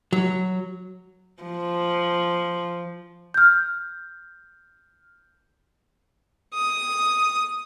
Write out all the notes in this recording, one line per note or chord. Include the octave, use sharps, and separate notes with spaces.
F#3
F3
F6 G6
D#6